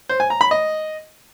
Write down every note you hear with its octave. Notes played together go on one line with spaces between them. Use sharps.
C5
G#5
A#5
B5
D#5